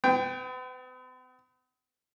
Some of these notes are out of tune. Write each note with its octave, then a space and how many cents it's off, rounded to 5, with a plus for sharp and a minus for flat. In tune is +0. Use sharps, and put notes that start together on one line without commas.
B3 +45 G5 +0